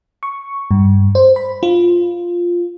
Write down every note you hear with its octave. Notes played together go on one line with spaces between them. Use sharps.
C#6
G2
C5
B5
F4